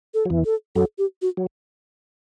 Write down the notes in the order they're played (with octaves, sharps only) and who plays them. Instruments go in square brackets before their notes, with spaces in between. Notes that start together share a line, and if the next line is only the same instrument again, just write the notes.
[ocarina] A4
[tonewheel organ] F#3
E2 E3
[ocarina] A4
[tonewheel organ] F#2 F#3 [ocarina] A4
[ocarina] G4
F#4
[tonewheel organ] F#3